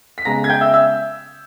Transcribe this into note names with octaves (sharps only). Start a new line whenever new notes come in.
B6
C#3 G#3 B3 A#5 A#6
G#6
G5 G6
E5 E6
E5 E6